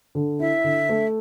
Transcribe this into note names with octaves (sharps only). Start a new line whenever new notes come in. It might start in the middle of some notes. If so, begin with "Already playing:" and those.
D3
E4 E5
D3
A3